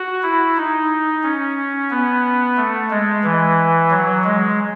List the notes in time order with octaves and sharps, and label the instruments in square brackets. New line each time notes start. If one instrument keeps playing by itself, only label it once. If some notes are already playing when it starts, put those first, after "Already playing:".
Already playing: [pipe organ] F#4
E4
D#4
C#4
B3
A3
G#3
E3
F#3
G#3